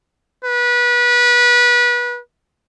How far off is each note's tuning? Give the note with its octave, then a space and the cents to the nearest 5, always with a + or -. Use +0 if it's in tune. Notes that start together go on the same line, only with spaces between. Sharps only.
B4 -25